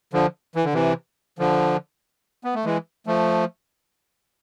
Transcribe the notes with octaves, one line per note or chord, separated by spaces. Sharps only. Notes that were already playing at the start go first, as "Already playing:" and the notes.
D3 F3
E3
D3
C3 E3
D3 F3
B3
A3
E3 G#3
F3 A3